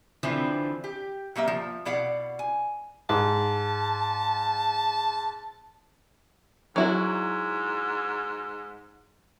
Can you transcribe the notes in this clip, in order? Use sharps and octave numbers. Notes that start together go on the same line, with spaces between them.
D3 E3 F3 C4 E4
G4
F#3 G3 A#3 E5
F3
B2 E4 D5 F5 F#5
G#5
G#2 A5
G#2 F#3 E4 F#4